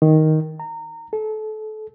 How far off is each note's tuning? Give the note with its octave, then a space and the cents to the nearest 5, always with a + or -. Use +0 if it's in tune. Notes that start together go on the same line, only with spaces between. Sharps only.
D#3 +5
A#5 -25
A4 -30